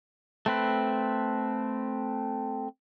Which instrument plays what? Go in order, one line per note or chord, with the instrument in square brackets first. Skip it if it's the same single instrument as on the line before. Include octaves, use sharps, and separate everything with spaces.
[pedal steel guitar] A3 C4 B4